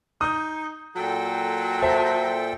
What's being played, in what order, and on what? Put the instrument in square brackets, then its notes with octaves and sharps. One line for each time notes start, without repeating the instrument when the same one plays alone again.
[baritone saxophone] D#4 [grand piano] D#6 G6
[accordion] A#2 A4 G5 [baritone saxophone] F#3
[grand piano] C5 E5 A5